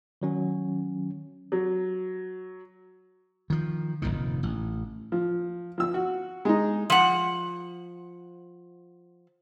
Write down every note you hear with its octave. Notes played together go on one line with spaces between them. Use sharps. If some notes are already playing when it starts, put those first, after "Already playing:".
D#3 F#3 C#4
F#3
D#3 F3
F1 B1 A#2 D#3
A1
F3
F3 E6
F#4
G#3 D#4
F3 F#5